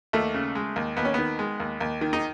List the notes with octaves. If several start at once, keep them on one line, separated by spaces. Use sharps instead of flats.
D#2 A3
C#3
G#3
D#2
D#2 B3
C#4
D#3 B3
G#3
D#2
D#2
D#3
D#4